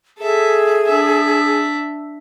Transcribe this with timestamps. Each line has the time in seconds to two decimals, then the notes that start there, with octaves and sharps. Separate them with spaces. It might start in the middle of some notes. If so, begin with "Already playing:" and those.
0.18 G#4 A4 E5
0.86 D4 E5